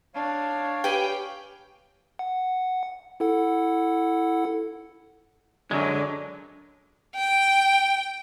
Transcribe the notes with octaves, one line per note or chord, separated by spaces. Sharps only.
D4 C#5 F5
G4 B4 G5 G#5
F#5
E4 A4 F#5
F#2 D3 F#3 G#3
G5